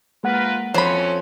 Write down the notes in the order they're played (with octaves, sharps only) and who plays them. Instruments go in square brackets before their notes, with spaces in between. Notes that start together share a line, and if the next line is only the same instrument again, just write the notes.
[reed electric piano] G#3 A#3 F#5 [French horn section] F4 A#4 B4
[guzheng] F2 [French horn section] E3 F#3 C#4 [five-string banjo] C5 B5 [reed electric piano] C#5